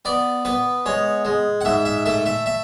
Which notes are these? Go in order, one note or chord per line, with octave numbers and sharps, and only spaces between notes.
B3 D5
B3 B4
G#3 C#5
G#3
F#5
G#2 E5
E5
A3 E5
E5
E5